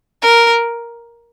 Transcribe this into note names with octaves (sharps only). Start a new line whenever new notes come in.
A#4